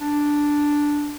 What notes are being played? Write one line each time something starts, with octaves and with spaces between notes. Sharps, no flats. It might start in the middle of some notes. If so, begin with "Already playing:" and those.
D4